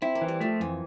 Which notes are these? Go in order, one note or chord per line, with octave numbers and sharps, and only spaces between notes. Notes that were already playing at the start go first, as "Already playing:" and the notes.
C4 E4
A#3
E3
G3
F3 A3
F2 E3